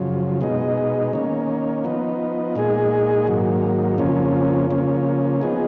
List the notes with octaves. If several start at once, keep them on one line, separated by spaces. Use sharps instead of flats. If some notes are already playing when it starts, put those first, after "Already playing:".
Already playing: F#2 C#3 F3
B2 G#3 D#4
D#3 A#3 C#4
F3 B3 D#4
A#2 G#3 D#4 G#4
G#2 D#3 F#3 A#3
F2 C#3 F3 A#3 C#4
C#3 F3 A#3 C#4
F3 B3 D#4 G#4